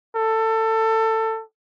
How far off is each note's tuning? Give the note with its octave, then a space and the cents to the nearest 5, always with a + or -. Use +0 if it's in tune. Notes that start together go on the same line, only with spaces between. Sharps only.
A4 +20